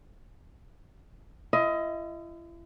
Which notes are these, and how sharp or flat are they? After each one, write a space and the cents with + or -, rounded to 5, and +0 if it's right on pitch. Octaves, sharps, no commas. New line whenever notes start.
E4 +45 D#5 +20